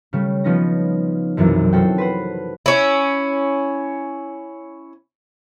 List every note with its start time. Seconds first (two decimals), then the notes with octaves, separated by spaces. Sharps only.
0.13 C#3 G3 A3
0.44 F3 B3 C#4 D#4 A#6
1.37 B1 F#2 C3 E3 F#3
1.72 C4 C#4 F#4 A4 G5
1.98 B4 C5 F#5
2.66 C#4 E4